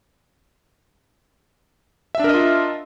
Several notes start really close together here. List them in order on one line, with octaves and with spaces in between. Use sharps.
E5 D4 A#4 D#5 F4